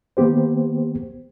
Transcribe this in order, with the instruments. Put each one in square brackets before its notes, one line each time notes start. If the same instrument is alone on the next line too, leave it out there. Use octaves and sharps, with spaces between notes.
[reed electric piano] D#3 A#3 B3 G4 C5